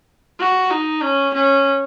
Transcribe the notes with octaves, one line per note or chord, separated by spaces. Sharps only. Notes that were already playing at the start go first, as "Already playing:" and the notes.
F#4
D#4
C#4
C#4